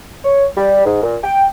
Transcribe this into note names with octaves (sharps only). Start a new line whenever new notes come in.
C#5
G3
G#2
A#2
G5